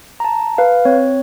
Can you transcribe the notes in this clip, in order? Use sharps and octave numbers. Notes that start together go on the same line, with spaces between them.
A5 A#5
B4 F5
C4 C#5